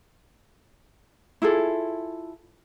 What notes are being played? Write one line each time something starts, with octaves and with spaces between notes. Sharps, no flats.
E4 F4 G#4 A4